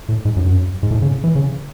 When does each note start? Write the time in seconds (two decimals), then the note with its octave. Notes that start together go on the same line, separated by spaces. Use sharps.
0.09 A2
0.25 G#2
0.36 F#2
0.47 F#2
0.83 G#2
0.91 A2
1.02 C#3
1.24 E3
1.35 C#3